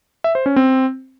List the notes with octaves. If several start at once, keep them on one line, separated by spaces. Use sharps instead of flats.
E5
C5
C#4
C4